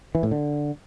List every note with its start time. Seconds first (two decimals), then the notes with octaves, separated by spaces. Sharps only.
0.15 E3
0.23 A2
0.31 D3